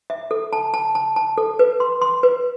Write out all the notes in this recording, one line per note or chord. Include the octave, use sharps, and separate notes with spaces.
E5
A4
A5
A5
A5
A5
A4
B4
C6
C6
B4